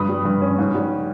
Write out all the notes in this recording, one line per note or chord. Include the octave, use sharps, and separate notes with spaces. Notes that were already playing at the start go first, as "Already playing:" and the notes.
Already playing: G2 B5 D#6
G3
G2
C#4
G#2
G3